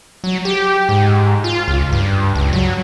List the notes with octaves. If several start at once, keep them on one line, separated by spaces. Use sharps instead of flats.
F#3
G4
G#2
F4
C#2
G2
C#2
F#3